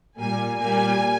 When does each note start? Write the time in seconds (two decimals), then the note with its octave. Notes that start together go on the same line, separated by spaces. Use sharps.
0.19 A#2 G3 A#3 G#5
0.59 A#2 G3 A#3 G#5